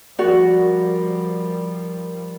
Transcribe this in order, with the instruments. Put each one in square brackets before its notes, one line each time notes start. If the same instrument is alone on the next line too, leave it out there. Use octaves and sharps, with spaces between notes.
[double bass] F3 G3 [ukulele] F#4 D5 [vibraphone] A#4